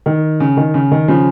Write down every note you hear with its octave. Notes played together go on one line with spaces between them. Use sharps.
D#3
C#3
D#3
C#3
D#3
C#3 F3